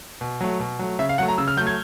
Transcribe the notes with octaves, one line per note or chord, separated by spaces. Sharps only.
B2
F#3 A3
B2
F#3 A3
C#3 E5
F5
F#3 A3 F#5
A#5
C#3 E6
F6
F#3 A3 G6
G#6